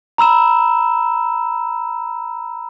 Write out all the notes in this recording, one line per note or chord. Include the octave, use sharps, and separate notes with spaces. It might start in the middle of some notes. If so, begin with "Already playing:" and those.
A#5 B5 E6 E7